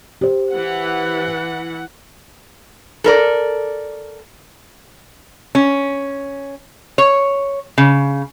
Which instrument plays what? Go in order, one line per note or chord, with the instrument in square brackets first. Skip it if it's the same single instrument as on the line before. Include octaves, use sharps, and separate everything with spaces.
[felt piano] G4 C5
[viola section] E3 F#5
[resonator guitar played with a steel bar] A4 A#4 D5
C#4
C#5
C#3